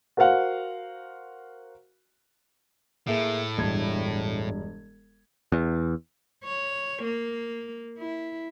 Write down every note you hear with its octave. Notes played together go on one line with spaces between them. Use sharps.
F#4 A#4 C5 F5 F#5
A2 A#3 G#4 E5
E1 G2 G#6
E2
C#5
A#3
E4